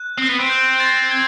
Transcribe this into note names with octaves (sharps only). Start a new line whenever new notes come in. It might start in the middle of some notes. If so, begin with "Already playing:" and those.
Already playing: F#6
C4
B3
C4
G6
A6
G#6